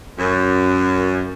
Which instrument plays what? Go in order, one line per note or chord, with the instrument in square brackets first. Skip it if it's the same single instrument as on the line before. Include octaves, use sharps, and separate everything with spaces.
[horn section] F#2